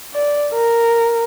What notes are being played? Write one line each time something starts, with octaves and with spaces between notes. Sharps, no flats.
D5
A#4